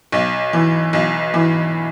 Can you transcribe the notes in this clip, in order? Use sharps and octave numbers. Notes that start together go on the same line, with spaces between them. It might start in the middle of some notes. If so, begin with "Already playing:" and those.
B1
E3
B1
E3